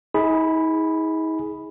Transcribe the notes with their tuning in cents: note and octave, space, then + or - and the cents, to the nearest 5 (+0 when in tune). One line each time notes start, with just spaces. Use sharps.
D#4 +45 G#4 +0 B5 +0